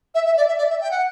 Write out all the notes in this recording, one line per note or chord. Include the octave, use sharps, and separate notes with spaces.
E5
E5
D5
E5
D5
E5
G5
F#5